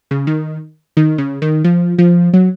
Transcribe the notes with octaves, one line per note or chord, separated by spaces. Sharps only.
C#3
D#3
D#3
C#3
D#3
F3
F3
F#3